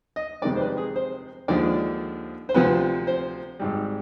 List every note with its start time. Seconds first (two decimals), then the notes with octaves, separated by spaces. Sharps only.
0.16 D#5
0.42 F2 C3 D#3 G#3 D5
0.56 C5
0.60 B4
0.77 G#4
0.96 C5
1.48 D#2 D3 F3 G#3 D5
2.49 C5
2.54 D2 C3 F3 B4
3.07 C5
3.60 G#1 G#2 G3